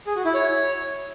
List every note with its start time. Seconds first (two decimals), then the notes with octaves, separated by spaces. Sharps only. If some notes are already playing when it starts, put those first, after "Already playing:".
0.07 G#4
0.16 F#4
0.25 E4
0.34 C#5